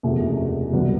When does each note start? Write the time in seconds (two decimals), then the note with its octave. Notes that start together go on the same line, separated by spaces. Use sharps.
0.03 F#1 E2 C3 F3 A3
0.72 C2 B2 F#3 B3